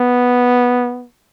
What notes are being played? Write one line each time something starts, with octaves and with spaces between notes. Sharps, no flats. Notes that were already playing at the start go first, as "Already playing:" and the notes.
Already playing: B3